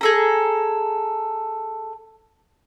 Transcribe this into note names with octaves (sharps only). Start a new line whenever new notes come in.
G#4 A4 A#5